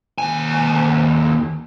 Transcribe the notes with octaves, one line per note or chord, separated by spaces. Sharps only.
D#2 G#5